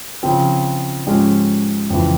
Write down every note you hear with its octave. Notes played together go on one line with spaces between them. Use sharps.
C#3 F3 C4
G#2 F3 G#3 C#4 G4
F2 C#3 E3